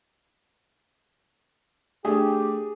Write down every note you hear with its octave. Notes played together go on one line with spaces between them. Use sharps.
A3 D4 G4 G#4